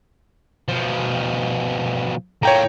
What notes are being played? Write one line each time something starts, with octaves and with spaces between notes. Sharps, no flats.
B2 F3
A2 A#3 C#5 G5 A#5